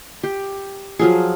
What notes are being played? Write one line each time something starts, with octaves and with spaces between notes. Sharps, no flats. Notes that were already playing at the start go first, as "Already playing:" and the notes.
G4
F3 F#3 G#4